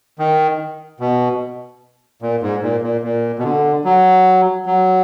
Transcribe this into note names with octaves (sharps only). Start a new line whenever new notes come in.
D#3
B2
A#2
G#2
A#2
A#2
A#2
B2
D3
F#3
F#3